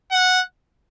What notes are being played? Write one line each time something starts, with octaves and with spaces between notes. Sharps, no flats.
F#5